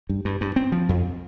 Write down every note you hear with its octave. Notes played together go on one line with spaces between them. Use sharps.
G2
G2
G2
C4
F3
F2